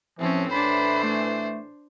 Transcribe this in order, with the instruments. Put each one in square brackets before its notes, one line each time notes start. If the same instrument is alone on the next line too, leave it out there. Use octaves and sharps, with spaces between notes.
[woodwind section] A2 E3 [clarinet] F3 [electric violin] C4 C#4
[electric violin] D4 C5 [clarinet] B5
[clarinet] A3